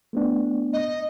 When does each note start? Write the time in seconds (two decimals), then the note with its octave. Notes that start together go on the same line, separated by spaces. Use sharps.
0.13 A3 B3 D4
0.73 D#5